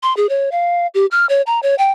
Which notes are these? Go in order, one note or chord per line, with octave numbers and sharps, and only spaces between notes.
C6
G#4
C#5
F5
G4
F6
C#5
A#5
C#5
G5